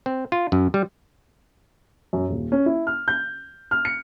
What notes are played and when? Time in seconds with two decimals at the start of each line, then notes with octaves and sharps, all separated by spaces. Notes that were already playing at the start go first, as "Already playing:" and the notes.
0.06 C4
0.32 F4
0.52 F#2
0.74 G3
2.13 F#2
2.29 D#1
2.52 C#4
2.66 E4
2.87 F6
3.08 G6
3.71 F6
3.85 C#7